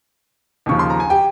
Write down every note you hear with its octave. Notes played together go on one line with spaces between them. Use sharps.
D#2 C#3 F3 C#6
C6
A#5
G#5
G4 G5